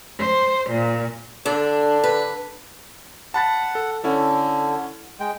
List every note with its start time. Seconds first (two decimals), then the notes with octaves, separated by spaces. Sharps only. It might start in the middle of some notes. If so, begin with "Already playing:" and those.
0.18 C5
0.70 A#2
1.46 D3 D4
2.04 B4
3.34 F#5 A5 B5 A6
3.75 A4
4.04 D3 C#4 E4 A4
5.20 G#3 G5